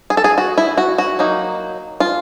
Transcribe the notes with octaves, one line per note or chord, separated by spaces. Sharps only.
G#4
A4
G#4
F#4
E4
F#4
F#4
F#3 A#3 D#4
F4